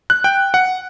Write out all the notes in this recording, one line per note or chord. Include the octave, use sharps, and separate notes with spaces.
F#6
G5
F#5